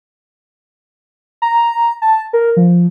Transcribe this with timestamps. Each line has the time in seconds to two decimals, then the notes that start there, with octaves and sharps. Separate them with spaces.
1.42 A#5
2.02 A5
2.33 A#4
2.57 F3